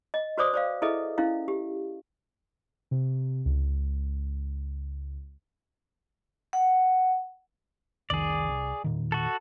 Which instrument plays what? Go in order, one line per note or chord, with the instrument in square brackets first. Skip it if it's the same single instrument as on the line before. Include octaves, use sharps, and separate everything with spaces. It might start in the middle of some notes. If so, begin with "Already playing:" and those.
[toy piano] D#5
F#4 B4 C5 D5 D6 D#6
C5 D5 F5
E4 G#4 A4 B4 D#5 E5
C#4 E4 F5
G4
[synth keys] C3
C#2
[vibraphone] F#5
[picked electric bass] F1 C2 D#3 [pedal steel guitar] G#4 D5
[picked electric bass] C2
E1 A#2 D#3
[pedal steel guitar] F#4 A4